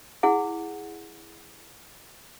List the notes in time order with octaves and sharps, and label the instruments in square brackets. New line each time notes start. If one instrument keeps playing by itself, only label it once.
[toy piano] E4 G#4 F#5